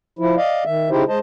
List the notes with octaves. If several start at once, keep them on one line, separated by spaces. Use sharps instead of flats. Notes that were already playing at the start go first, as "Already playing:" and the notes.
F3 E4
D5 D#5 F5
D#3 E5
C#3 D#4 E4 G4 C5
G#3 C5 D#5 A5